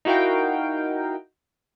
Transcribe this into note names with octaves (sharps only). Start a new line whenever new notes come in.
D#4 E4 F#4 A#4 F5 G5